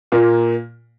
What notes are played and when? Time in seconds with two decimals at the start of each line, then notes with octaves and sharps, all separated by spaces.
0.12 A#2 A#3